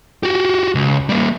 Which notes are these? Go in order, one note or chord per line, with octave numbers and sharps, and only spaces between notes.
F#4 G4
C#2
G3 A#3